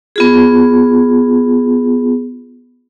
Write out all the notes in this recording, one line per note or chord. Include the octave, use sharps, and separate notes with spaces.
B3 F4 G#4